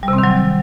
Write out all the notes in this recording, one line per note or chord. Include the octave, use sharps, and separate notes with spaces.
G3
C3
C4
D#3
F#3